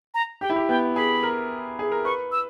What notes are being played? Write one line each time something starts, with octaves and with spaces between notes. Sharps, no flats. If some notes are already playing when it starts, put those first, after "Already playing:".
A#5
G4 G5
E4
G4
B3 G5
G#4 B5
A#4
G#4
A#4
B4 C#6
E6